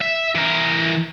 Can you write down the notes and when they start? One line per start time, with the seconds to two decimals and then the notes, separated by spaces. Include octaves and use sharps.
0.01 E5
0.35 E3 A#4